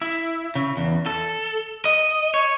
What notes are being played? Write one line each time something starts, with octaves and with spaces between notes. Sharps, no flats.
E4
C#3
E2
A4
D#5
C#5